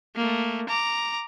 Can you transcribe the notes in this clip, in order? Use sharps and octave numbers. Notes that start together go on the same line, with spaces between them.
A3 A#3
A#5 D6